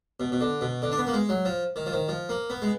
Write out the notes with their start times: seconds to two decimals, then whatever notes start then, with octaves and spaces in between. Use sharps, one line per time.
0.20 B2
0.32 B2
0.41 D3
0.61 B2
0.82 D3
0.92 D4
0.98 B3
1.07 A#3
1.13 G#3
1.29 F#3
1.45 F3
1.76 D#3
1.86 F3
1.92 D#3
2.08 F3
2.29 A#3
2.50 B3
2.62 G#3